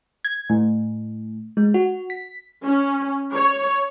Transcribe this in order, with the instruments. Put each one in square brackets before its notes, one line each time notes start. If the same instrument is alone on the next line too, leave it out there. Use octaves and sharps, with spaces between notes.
[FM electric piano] G#6
A2
G#3
F#4
B6
[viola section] C#4
C#5